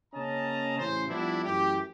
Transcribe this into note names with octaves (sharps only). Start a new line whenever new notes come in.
C#3 A#3 C#4 D#5 A5 A#5
A1 C#3 C#4 C5
F3 G3 B3 D4 E4
F#2 E3 A3 G4